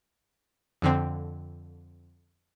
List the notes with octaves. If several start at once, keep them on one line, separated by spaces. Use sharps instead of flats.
F2 D3 C4